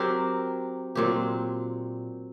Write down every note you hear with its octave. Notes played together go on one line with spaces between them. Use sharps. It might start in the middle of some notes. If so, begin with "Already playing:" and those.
Already playing: F#3 C4 G4 A#4
A#2 F#3 C4 G4